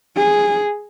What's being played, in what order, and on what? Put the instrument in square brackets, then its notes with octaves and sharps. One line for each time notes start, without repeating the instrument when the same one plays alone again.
[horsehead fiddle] G#4